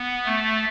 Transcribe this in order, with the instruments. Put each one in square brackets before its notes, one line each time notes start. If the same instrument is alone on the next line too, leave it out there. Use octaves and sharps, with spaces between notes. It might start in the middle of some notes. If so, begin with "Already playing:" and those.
Already playing: [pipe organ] B3
A3